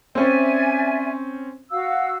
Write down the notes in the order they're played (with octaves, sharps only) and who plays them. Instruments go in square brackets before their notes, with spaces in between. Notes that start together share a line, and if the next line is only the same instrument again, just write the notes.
[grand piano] C4 C#4 C5 [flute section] D5 E5 G#5
[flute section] F#4 F5 E6